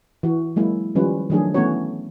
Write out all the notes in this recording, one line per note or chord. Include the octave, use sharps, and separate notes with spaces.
E3 F#4
F#3 G#3 A#3 E4
D#3 F3 G3 C#4 F4 B4
D#3 F3 F#3 A3 D4 G#4
E3 A3 B3 C#4 F#4 C#5